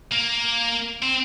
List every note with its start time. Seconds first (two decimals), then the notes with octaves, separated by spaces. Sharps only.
0.12 A#3
1.02 C4